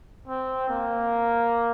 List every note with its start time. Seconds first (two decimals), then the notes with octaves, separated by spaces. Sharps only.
0.28 C4
0.69 A#3